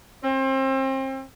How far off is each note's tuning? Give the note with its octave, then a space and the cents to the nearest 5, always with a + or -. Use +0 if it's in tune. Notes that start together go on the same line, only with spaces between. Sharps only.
C4 +35